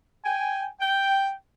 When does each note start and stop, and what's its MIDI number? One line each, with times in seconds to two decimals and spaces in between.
0.24 0.64 79
0.24 0.64 80
0.80 1.31 79